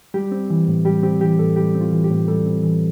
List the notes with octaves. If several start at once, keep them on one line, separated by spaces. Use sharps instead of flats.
G3 G4
C4
E3
A2
G3 G4
C4 G4
E3 G4
A2 A4
G3 G4
C4
F4
E3
G4
A2
G3 A4
C4
E3